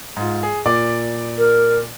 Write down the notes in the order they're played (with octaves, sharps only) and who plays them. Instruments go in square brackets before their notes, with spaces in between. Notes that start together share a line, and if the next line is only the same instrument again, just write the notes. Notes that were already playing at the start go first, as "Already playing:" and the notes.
[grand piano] G#2 F4
G#4
A#2 D5 D6
[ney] A#4